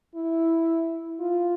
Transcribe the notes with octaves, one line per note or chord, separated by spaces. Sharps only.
E4
F4